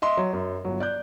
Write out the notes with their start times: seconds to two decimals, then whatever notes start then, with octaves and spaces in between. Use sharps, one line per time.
0.02 D#5 E5 C6
0.17 F#3
0.33 F#2
0.65 G1 F#3
0.80 D5 F#6 G6